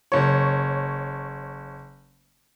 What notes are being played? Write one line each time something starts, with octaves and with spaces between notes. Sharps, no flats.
F#1 C#5